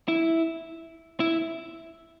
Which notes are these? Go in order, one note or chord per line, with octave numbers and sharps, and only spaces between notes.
E4
E4